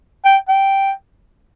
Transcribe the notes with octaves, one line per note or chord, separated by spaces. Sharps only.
G5
G5